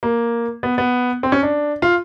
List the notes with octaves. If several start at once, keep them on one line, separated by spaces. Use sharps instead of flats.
A#3
B3
B3
C4
C#4
D4
F4